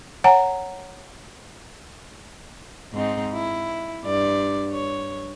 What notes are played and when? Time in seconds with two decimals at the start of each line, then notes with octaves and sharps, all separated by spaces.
0.24 C#5 F#5 G#5 A#5
2.93 G#2 C4 D#4
3.33 E4
4.04 G2 D5
4.72 C#5